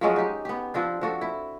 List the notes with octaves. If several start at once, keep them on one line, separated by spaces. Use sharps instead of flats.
F3 F#3 G#3 C#4
D#4 G4
B3 G4
F3 C4 D4
F3 F#4 A4
E4